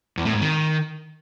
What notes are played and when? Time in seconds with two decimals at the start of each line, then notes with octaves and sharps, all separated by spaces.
0.17 E2
0.25 A2
0.33 G#2
0.41 D#3